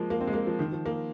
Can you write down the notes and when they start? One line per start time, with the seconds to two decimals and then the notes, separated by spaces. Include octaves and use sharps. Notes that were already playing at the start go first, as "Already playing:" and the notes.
Already playing: F3 G#3 A#3
0.10 A#3
0.21 C4
0.27 G#3
0.33 A#3
0.47 F3
0.59 D#3
0.72 F3
0.86 A#3